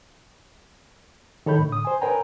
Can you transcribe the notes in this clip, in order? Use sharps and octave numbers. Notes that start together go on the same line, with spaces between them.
D#3 A4 C#5 B5 G6
A2 D3
D#6
C5 G#5
A#4 B4 C#5 G5 G#5 A#5